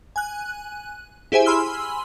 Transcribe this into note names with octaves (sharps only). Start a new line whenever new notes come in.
G#5 F#6
E4 G4 G#4 C5 E5 G#5
G#5 B5 C6 E6 F6